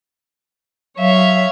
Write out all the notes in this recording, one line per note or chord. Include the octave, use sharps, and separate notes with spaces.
F#3 C#5 E5 F5